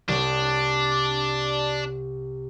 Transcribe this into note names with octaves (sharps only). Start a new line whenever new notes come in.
C2 D4 C#5 D7